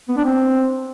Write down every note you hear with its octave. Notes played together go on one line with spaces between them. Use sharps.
B3
D4
C4